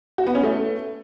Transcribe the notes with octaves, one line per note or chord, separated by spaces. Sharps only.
F#4
B3
C#4
A3